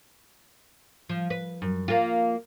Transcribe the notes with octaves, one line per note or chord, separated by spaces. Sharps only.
F3
B4
F#2
A#3 F4